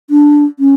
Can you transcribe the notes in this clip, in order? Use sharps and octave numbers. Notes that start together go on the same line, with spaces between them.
D4
C#4